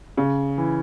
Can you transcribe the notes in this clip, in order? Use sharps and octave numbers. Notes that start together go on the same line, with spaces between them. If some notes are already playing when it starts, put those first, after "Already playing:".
C#3
E3